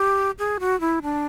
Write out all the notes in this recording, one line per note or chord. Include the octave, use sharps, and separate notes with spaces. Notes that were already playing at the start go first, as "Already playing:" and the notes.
Already playing: G4
G#4
F#4
E4
D4